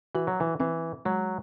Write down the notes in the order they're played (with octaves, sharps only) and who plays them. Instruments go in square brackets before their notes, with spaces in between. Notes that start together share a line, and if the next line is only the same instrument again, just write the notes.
[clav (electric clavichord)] E3 [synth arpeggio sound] F#4
[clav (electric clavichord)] F#3
E3
[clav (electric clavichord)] E3 [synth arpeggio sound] C4
[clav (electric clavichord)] F#3 [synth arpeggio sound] G#3